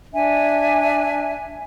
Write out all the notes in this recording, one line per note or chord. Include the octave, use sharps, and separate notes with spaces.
D4 E5 G#5